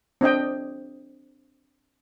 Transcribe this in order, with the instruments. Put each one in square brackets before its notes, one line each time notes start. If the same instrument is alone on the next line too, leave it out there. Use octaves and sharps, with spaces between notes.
[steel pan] C4 D4 D#5 G5